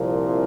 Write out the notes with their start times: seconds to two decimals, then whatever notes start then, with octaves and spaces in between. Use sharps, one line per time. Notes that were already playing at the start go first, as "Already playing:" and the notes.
Already playing: C2 A#2 F3